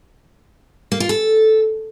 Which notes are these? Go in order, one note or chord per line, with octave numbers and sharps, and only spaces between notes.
A#3
F4
A4